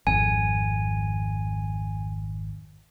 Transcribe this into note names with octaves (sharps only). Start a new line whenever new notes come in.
G#1 F2 G#5